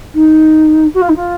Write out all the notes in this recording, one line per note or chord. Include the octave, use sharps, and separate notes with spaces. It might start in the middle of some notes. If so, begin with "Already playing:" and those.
D#4
F#4
F4
D#4
F4